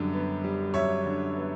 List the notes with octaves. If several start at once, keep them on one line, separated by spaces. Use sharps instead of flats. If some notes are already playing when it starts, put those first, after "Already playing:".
Already playing: F#2 D3 G3
B3
G3
F#2 C#5 E5
D3
B3